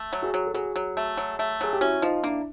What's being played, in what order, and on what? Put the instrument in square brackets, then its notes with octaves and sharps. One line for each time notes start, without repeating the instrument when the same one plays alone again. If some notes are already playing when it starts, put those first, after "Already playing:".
Already playing: [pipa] A3
F#3
[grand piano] F#4 G#4
[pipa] F#3
[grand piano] A4
[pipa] F#3 [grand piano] F#4 G#4
[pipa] F#3
A3
F#3
A3
[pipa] F#3 [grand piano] G#4
[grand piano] G4
[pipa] C#4 [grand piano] E4 F#4
[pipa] F3 [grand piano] D#4 F4
[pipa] A#3 [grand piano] D4 E4